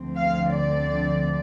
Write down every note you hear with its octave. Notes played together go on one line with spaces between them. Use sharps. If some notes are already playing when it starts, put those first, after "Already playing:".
Already playing: D2 D3 F3 C4
F5
D5